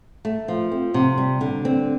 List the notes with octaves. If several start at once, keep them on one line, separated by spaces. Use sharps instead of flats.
A3
F3
C4
C3
G3
D3
C4